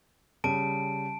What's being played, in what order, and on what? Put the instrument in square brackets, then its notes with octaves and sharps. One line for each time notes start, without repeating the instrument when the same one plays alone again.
[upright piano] C#3 G3 [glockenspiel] A5 D7